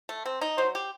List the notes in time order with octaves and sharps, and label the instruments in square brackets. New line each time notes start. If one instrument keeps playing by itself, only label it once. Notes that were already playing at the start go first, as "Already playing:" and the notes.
[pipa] A3
C4
D#4
[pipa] F#3 [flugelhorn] C5
[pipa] G4